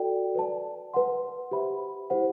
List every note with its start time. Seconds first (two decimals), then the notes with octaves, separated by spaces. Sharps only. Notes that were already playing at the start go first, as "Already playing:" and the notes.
Already playing: F#4 A4 D5 G5
0.35 B4 D5 A5
0.94 B4 F#5 C6
1.51 G4 C5 E5 B5
2.10 E4 G4 C5 F#5